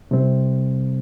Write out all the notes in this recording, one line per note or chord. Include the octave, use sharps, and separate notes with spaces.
C3 G3 C4